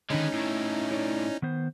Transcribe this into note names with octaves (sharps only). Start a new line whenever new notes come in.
D3 D#3 G#3 C#4 D#4 B4
A2 D#3 E4
E4 C#5 D5
D#3 B3 C5